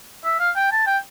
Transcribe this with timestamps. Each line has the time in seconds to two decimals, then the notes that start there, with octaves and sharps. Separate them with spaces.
0.24 E5
0.39 F5
0.56 G5
0.72 A5
0.87 G5